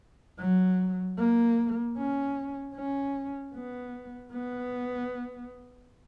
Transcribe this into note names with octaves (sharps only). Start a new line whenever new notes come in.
F#3
A#3
C#4
C#4
B3
B3